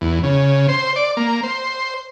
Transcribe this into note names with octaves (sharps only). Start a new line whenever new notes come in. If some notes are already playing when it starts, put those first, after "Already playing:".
E2
C#3
C5
D5
A#3
C5